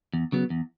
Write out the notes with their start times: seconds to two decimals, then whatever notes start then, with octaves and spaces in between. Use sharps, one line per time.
0.13 E2
0.32 C#3 F#3 B3
0.50 E2